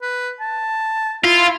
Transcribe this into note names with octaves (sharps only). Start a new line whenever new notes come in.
B4
A5
E4 F4